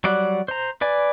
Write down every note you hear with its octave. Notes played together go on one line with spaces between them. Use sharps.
F#3 G3 D5 F#5
C5 A#5
B4 D5 G#5